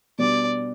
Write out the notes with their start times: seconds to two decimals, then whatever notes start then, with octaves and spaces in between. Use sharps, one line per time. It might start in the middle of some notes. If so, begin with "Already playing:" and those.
0.19 B2 G3 B3 D4 D5